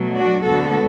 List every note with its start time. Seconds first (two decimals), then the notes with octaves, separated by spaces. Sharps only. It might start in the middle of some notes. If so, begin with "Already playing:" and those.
Already playing: B2 F#3 A3
0.16 D4 F#4
0.45 D2 D3 G#3 B3 F#4 A4